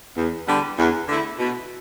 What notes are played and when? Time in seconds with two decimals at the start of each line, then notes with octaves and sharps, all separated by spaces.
0.17 E2
0.47 D3 G3 B3 D4
0.78 E2
1.08 D3 A3 E4
1.39 B2